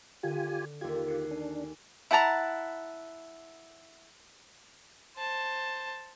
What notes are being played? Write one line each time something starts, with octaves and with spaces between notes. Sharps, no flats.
D3 F4 G4 G#5
D#2 F4 G4 G#6
F#6 C7 C#7
D4 G#5
E4 F#5 A5 A#5
C5 A5